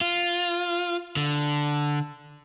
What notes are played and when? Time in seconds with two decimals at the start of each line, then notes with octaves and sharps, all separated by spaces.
0.01 F4
1.17 D3